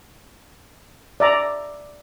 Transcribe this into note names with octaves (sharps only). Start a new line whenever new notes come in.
D5 E5 A#5